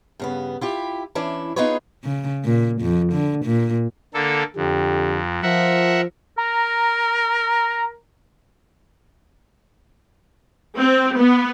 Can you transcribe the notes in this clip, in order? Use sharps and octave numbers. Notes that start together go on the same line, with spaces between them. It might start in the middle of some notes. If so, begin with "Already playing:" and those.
G2 C#3 B3
E4 F4 G4
E3 C#4 D4 E4
B3 D#4 F4 G#4 B4 C#5
C#3
A#2
F2
D3
A#2
D3 A#3 A4
F2 D3 G4
F3 A#4 E5 F#5
A#4 A#5
C4
B3